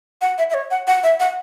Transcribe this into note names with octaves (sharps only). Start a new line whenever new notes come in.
F#5
E5
E5
C#5
F#5
F#5
E5
F#5